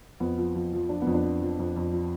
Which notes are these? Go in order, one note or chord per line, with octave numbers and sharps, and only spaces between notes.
F2 B3
F3
F3
F3
F3 D4
B3
F2
D4
F3
F3
F2
F2
F3